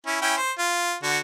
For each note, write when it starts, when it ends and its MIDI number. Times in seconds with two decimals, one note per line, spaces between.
0.06 0.19 61
0.06 0.19 64
0.22 0.36 61
0.22 0.36 64
0.22 0.36 79
0.37 0.52 72
0.59 0.95 65
1.03 1.19 50
1.03 1.19 66